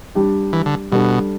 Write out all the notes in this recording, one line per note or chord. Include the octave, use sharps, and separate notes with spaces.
G3 D4 G4
E3
D3
B2 G3 D4 A4